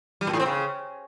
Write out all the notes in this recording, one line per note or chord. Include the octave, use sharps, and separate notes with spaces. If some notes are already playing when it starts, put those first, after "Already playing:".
G3
A#2
A2
C4
C#3